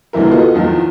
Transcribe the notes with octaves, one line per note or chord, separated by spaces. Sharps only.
D2 C3 E3 E4 A#4
B3 F4 F#4 A4 D#5
E2 D#3 F3 F4